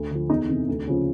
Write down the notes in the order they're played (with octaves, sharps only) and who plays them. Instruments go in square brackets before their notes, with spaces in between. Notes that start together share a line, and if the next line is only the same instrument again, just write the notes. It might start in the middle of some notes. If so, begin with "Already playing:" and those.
Already playing: [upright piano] D2
D3 F3
E2 D#4
C3 E3
D2
C#3 F3